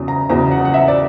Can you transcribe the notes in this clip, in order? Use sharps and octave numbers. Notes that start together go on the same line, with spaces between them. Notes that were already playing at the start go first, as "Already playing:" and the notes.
Already playing: E2 C#3 F#3
A#5
E2 C#3 F#3 A#5
F#5
F#5
E5
D5